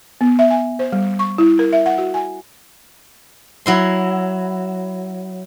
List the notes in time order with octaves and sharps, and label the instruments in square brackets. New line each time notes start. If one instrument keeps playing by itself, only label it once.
[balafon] B3
E5
G#5
C5
G3
C#6
E4
A#4
E5
F#5
F#4
G#5
[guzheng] F#3 E4 C6